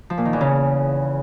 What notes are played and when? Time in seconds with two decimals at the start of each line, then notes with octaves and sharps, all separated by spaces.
0.10 F3
0.18 A#2
0.25 D#3
0.33 E2
0.41 C#3